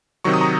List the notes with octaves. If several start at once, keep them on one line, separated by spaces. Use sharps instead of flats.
C3 D#3 F#3 C#6
D#6
A#5 C#6